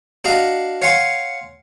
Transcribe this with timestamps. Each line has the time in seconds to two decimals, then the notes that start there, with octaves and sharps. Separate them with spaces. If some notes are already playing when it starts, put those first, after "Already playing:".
0.25 D4 F#4 D#5 F5 A#5
0.82 C#5 F5 F#5 G#5 C6 C#6